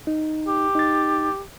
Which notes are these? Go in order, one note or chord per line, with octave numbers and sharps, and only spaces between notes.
D#4
G4
D#4 A6